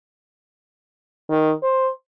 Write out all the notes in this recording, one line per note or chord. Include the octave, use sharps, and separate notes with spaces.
D#3
C5